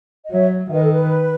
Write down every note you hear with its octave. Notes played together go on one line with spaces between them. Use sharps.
D#5
F#3 C#5 E5
E5
D#3 B4 D#5
A4
B4